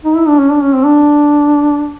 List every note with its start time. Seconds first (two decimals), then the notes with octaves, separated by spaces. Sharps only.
0.04 D#4
0.17 E4
0.27 D4
0.39 C#4
0.50 D4
0.62 C#4
0.74 C4
0.85 D4